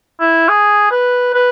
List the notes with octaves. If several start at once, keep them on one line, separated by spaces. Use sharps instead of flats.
E4
G#4
B4
B4